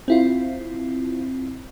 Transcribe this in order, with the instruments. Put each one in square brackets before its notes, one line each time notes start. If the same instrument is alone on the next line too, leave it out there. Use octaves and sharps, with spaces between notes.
[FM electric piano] C4 E4 F4